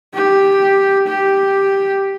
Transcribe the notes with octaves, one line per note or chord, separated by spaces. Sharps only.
G4
G4